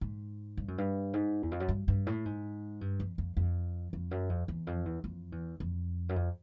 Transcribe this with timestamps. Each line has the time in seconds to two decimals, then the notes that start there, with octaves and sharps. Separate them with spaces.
0.01 G#2
0.57 G2
0.68 F#2
0.78 G2
1.13 G#2
1.43 E2
1.51 F2
1.60 F#2
1.69 G2
1.88 G2
2.07 A2
2.25 G#2
2.81 G2
3.00 F2
3.18 F2
3.37 F2
3.93 F2
4.11 F#2
4.29 F2
4.48 E2
4.67 F2
4.85 E2
5.04 F2
5.32 E2
5.60 F2
6.09 F#2
6.16 F2